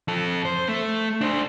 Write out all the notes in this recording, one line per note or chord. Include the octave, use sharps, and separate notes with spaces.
F2 A4
C5
A3
D4 C5